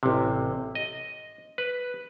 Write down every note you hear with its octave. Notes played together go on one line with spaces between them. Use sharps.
A1 C3
D#5
B4